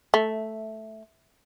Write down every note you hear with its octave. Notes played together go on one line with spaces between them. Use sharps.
A3